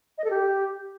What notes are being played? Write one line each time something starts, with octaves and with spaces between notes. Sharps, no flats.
D#5
A4
G4